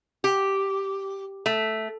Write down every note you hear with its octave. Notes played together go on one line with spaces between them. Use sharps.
G4
A3